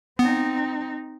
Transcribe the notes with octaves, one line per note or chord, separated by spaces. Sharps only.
B3 C4 D#4